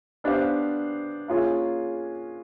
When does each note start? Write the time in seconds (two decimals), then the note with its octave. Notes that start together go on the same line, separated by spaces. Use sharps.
0.24 B3 D4 G4 C5 F5
1.28 A#3 C#4 F4 G#4